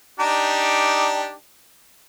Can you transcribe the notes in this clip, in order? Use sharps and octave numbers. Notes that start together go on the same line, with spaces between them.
D4 D#4 G4